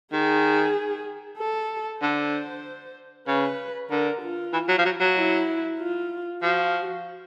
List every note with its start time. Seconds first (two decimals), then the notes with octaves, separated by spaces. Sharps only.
0.12 D#3 G#4
1.38 A4
2.01 D3 C5
3.27 C#3 B4
3.90 D3 A#4
4.22 F4
4.53 E3
4.69 F#3
4.78 F3
4.85 F#3
5.00 F#3
5.16 E4
5.79 F4
6.42 F3 F#4